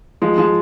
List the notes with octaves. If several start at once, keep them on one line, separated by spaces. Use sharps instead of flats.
F3 G#3
F3 G#3